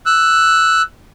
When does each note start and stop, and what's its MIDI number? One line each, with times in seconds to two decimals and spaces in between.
0.06 0.82 88
0.06 0.82 90